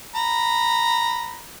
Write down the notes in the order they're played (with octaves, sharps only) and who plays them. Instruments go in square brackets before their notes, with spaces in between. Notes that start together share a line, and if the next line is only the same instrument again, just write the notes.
[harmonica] A#5 B5